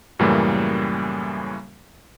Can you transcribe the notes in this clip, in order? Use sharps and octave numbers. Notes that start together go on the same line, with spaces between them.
F#2 A2 C#3 E3 G3 A#3